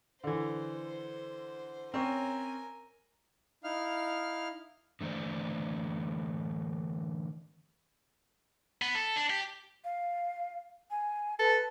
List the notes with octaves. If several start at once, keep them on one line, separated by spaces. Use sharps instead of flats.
D3 E3 C5
C4 C#4 A#4 C#5 G#5
D#4 E4 F5 F6
D3 E3 A3 C5 D5
B3
A4
D4
G4
F5
G#5
A4 B4